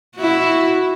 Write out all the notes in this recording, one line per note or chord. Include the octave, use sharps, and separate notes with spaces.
E4 F#4